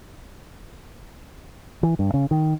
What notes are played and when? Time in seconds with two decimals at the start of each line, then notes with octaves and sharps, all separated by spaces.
1.83 E3
1.99 G2
2.14 C#3
2.31 D#3